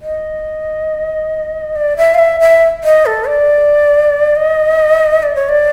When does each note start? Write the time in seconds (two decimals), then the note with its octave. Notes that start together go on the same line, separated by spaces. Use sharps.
0.02 D#5
1.75 D5
1.97 E5
2.14 F5
2.19 E5
2.40 E5
2.84 D#5
3.06 A4
3.27 D5
4.36 D#5
5.23 D5
5.35 C#5
5.49 D5